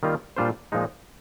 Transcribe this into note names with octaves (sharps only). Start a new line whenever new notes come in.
D#3 G3 A#3 F4
A#2 G3 D4 F4 C5
A#2 F3 G#3 D#4